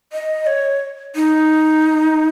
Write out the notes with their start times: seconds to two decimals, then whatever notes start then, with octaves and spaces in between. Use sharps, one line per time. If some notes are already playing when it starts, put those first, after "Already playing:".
0.13 D#5
0.47 C#5
1.15 D#4